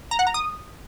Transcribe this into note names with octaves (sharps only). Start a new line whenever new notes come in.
A#5
F#5
A#5
D#6